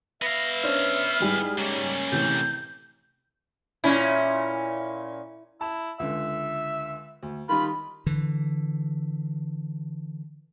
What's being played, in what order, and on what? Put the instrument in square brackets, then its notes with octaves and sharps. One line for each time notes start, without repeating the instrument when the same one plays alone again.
[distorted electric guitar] B3 F5 [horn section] B4 E5 [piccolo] A#6
[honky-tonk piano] C#4 D4 C5 [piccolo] F6
[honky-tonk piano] G#2 G3 [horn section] E4 G#4
[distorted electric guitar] C#3 A#3 [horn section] G#3 C#4
[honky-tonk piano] A2 C3 E3 [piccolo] G6
[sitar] A#2 C#4 [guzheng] E4
[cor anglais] E4 [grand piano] A5
[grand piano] C#2 D3 [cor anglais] E5
[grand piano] D2
[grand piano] D#3 G3 D#4 [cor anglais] F4 [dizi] B5
[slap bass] D3 E3